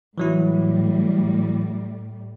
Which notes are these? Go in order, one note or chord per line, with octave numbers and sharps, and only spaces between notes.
A2 E3 F#3 G3 E4